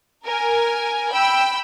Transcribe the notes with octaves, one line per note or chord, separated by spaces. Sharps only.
A#4 G#5
G5 B5 E6